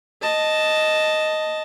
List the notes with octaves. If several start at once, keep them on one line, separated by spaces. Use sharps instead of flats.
D#5 A5